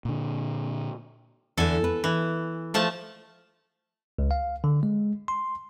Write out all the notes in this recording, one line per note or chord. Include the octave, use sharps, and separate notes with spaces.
A#2 D3
E2 D3 A4 G#5
B4
E3
F3 A3 A5
C#2
F5
D3
G#3
C6